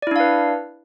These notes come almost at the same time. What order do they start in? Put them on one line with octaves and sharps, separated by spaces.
D5 E4 D4 F5 B4